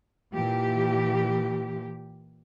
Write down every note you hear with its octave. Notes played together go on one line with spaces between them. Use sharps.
A#2 E3 G4